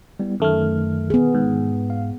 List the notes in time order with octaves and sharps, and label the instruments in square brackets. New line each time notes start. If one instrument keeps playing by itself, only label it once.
[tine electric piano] G3 B3 E4
[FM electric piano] F#2 A3 [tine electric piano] D#3 F6
[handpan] B3 G#4
[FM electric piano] G#2
[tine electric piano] F5